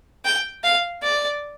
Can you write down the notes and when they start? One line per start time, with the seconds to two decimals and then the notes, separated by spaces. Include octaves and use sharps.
0.25 G5
0.64 F5
1.03 D5